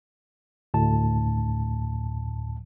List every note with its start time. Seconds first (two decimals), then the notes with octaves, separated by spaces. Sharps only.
0.74 D2 A2 A5